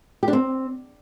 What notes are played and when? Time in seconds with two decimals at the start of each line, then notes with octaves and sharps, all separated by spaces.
0.23 G4
0.28 D4
0.33 C4